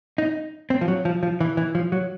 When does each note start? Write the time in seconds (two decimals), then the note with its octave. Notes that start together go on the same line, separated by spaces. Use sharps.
0.18 D#4
0.70 C4
0.81 F3
0.88 F#3
1.05 F3
1.23 F3
1.41 E3
1.57 E3
1.75 F3
1.92 F#3